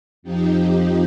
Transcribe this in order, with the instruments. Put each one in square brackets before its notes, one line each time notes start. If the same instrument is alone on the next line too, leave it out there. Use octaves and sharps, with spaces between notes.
[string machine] F2 F3 D#4 G4